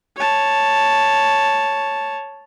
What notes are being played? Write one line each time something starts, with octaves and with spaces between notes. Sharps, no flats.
C#5 A5